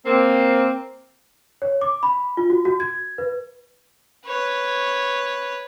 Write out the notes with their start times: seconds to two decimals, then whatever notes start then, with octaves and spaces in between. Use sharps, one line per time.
0.06 A#3 C4
1.62 C#5
1.81 D6
2.03 B5
2.37 F4
2.50 F#4
2.65 F#4
2.80 G#6
3.18 B4
4.26 B4 C#5